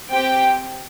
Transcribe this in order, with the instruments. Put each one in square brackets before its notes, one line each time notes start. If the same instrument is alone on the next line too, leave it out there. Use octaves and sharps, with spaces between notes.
[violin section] C4 G4 G5